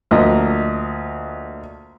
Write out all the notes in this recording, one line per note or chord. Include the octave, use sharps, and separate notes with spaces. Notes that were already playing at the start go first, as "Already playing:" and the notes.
D2 F3 A#3 D#5